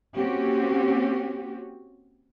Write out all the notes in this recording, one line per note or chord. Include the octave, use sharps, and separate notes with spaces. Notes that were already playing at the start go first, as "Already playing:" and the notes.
A#3 C4 C#4 F#4 G4